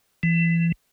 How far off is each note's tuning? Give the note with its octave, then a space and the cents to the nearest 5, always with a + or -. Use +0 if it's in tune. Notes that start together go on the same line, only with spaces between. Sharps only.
E3 +30